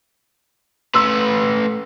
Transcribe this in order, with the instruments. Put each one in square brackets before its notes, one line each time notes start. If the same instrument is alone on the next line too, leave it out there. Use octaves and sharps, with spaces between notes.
[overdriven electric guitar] A3 B4 [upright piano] C6 E6